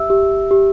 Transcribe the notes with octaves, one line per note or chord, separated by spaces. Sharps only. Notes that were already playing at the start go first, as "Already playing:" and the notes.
Already playing: G4 E5 E6
G4
G4